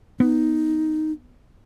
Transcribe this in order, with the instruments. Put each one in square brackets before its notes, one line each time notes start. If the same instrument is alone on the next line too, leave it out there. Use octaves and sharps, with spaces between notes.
[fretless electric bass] B3 [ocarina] D#4